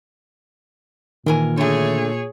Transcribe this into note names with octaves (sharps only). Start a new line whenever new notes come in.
A#2 D#3 E3 A#4 G#5
D3 A3 G#4 C#5